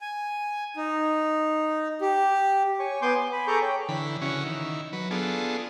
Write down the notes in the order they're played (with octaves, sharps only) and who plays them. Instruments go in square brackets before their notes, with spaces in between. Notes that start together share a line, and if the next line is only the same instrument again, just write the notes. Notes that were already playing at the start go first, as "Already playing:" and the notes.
[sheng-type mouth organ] G#5
D#4
G4
C#5 G#5 C#6
B3 G#5 C6 D6 G6
D6
G#5 B5
G#4 A4 A#5 C#6 D6 G6
C#5 G5
[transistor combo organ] D3 E3 B5
C#3 E3 C#4 F#4
D#3 E4
F#3 B4
B3 D4 F4 G#4 A4